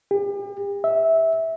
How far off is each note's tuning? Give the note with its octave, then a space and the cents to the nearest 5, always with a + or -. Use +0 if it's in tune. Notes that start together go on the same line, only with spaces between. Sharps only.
G4 +40
E5 -15